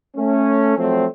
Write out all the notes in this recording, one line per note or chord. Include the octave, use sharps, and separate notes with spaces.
A3 C#4
F3 F#3 A3 C4